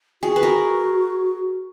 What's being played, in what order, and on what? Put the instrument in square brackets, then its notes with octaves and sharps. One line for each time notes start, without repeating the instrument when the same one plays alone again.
[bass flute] F#4 [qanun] G#4
[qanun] B4
A#4